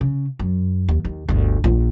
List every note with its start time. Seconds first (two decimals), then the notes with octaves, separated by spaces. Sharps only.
0.01 C#3
0.39 F#2
0.88 D#2
1.05 D#2
1.29 G1 D2
1.64 A#1 F4